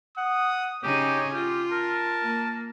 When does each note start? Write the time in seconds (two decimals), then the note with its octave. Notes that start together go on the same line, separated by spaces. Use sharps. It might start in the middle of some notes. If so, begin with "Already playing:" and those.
0.17 F#5 D#6
0.83 C#3 D#4 G4 G#4 C#5
1.33 F4 G4
1.72 A#4 A5
2.22 A#3